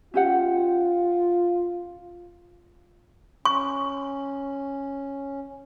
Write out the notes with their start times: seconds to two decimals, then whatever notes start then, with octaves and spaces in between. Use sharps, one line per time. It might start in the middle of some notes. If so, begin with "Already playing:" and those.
0.14 C#4 F4 G4 F#5
3.45 C#4 C#6